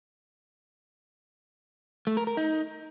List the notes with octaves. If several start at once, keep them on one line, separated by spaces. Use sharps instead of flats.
A3
A#4
A#4
D#4